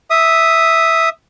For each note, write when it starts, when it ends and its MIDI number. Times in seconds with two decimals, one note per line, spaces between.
0.10 1.09 76
0.10 1.09 87